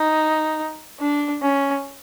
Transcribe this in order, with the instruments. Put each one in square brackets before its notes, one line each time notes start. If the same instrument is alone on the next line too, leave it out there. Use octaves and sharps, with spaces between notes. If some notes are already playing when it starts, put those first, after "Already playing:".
Already playing: [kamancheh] D#4
D4
C#4